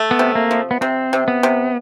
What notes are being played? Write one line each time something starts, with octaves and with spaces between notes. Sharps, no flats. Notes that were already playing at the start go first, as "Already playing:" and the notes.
Already playing: A3
B3
C3
A#3
F3
B3
C3 C4
C3
B3
C3